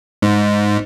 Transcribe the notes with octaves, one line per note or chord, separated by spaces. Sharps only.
G#2